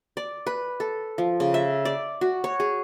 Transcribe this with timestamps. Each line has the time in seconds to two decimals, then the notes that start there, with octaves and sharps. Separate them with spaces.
0.17 D5
0.47 B4
0.80 A4
1.18 F3
1.40 C#3
1.54 E5
1.85 D5
2.21 F#4
2.44 C#5
2.60 G#4